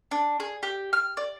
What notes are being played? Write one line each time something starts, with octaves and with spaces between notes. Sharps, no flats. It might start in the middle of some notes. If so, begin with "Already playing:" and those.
D4
G#4
G4
F6
D5